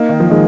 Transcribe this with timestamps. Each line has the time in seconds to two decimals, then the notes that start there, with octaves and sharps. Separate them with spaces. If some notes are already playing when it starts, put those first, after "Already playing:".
Already playing: A#3 D#4
0.09 D#3
0.20 F3
0.30 D#3 G#3